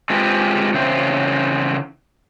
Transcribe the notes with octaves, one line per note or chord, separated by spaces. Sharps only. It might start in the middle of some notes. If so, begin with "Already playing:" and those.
G#3 C4 F4 G4 G#4 B4
C#3 E3 C4 C5